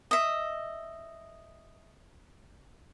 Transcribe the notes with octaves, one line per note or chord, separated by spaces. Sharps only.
D#5 E5